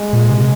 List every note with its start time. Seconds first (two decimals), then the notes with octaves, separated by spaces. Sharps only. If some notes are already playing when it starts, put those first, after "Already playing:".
Already playing: G#3
0.13 A#2
0.30 C3